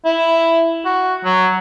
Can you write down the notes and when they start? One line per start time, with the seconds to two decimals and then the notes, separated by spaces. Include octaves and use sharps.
0.05 E4
0.85 F#4
1.25 F#3